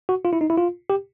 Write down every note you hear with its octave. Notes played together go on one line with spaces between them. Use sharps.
F#4
F4
E4
D#4
E4
F4
G4